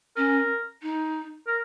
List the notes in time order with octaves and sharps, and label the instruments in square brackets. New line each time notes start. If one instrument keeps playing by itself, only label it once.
[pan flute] C#4 [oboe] A#4
[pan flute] D#4
[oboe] A#4